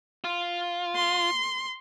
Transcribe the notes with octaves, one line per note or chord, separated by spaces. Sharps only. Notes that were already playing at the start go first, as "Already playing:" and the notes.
F4
C6